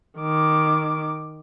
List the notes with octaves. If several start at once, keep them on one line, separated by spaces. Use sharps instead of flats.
D#3 D6